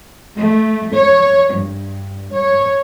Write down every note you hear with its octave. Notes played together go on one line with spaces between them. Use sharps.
A3
C#5
G2
C#5